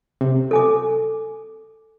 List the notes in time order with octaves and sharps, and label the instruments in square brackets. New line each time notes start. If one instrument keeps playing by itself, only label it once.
[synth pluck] C3
[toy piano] A4 G#5 D6